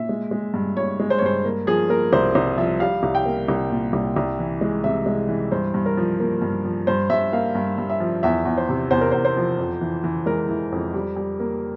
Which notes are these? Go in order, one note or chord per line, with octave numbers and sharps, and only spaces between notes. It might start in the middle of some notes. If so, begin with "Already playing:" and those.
Already playing: A#2 E5
G#3
G#3
G2
G2 C#5
G#3
C5
C#5
G2 C5
A#3
F3 G#4
A#3 A#4
C2 C5
C2 C5
F3 E5
G3 F5
C2
G5
A#3
C2
A#2
C2
C2
E3
G#3
C3 E5
G#3
E3
G2 C5
G2
A#4
F3
A#3
G2
F3
G2 C5
G2 E5
A#3 F5
G2
G2
E5
F3
E2 E5
E2
C5
C3
E2 C5
A#4
E2 C5
C5
F3
F2
E3
E3
G#3 A#4
E3
F2
G3
G3
A#3